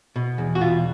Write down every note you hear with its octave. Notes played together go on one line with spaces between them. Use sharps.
B2
E2
F#4
B2 F4